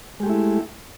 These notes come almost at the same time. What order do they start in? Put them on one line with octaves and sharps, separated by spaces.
G#3 G4 A3 E4